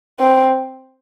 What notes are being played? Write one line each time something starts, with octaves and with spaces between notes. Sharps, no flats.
C4